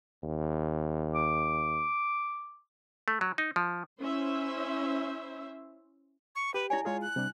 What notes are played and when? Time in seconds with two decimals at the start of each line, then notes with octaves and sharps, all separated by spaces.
0.23 D#2
1.15 D6
3.08 A3
3.21 F#3
3.38 D#4
3.56 F3
4.00 C#4 E4 C5 E5
6.35 C#6
6.54 G4 B4
6.70 E4 C#5 D5 G#5
6.85 G#3 F4 G#4 C#5
7.02 F#6
7.16 C3 G3 D4